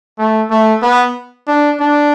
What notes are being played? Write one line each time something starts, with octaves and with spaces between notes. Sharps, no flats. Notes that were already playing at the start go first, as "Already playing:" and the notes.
A3
A3
B3
D4
D4